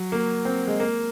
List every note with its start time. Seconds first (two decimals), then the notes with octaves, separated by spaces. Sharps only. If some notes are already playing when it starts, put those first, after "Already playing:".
Already playing: F#3
0.12 A#3
0.45 C4
0.67 G#3
0.80 A#3